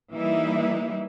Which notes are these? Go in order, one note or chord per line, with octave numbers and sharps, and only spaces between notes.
E3 G3 A#3 D#4 E4